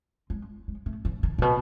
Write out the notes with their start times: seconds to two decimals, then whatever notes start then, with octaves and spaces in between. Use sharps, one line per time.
0.30 G#3
0.68 G#3
0.86 A3
1.05 E3
1.23 D#3
1.38 A#2
1.42 B2